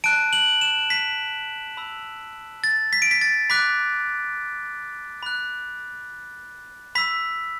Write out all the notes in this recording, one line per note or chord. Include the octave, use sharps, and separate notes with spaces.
A5 F#6 D7
F#7
E7
B6
B5 E6
A6
B6
D7
B6
A6
B5 D6 F#6 B6
B5 F#6
B5 E6 B6